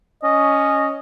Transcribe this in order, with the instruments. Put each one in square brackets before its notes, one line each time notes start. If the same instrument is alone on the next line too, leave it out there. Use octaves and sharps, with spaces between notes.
[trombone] C#4 [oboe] D#5